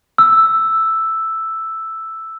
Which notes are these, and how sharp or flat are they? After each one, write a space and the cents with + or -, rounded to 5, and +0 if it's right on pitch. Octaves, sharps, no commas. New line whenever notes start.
E6 +0